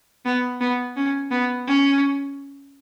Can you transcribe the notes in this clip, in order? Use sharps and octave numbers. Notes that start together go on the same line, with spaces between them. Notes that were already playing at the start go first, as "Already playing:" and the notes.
B3
B3
C#4
B3
C#4